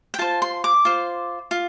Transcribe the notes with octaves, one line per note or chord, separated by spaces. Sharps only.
G5
F4 C5 A5
C6
D6
F4 C5
F4